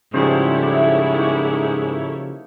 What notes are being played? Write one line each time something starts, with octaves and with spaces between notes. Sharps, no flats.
G#2 C#3 F3 G3 E4 A4 C5 C#5
D5 E5 F#5
A#3 D#4 C#6